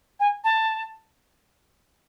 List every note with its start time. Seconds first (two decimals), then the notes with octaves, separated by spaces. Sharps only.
0.20 G#5
0.44 A5